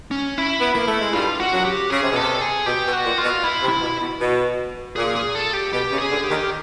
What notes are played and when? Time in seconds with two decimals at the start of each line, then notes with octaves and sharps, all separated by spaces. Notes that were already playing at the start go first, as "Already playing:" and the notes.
0.11 C#4
0.38 E4
0.60 B3
0.74 A#3 E4
0.87 A3
1.01 G#3
1.13 G2 G3 F4
1.40 F#4
1.52 F#2 F#3
1.65 G4
1.90 C#3 G#4
2.01 C3
2.11 B2 A4
2.22 C3
2.41 G#4
2.66 B2 G4
2.87 B2
2.93 F#4
3.05 A#2
3.18 F4
3.24 B2
3.44 E4
3.63 C3
3.68 E4
3.82 B2
4.01 B2
4.21 B2
4.96 A#2 G#4
5.15 G#4
5.35 A4
5.53 G4
5.73 B2 G4
5.92 C#3
5.98 G#4
6.11 D2 D3
6.24 G4
6.30 D#2 D#3